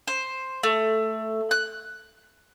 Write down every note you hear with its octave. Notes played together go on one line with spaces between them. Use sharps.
C5
A3
F#6